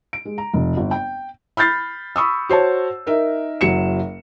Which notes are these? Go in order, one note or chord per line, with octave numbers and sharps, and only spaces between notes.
D7
G#3
A#5
F1
G1
G5
B5 F6 G6 A6 C7
B5 C#6 D#6 E6
F#4 C5 C#5 A5
D#4 A#4 E5
F#1 F#3 C#7 E7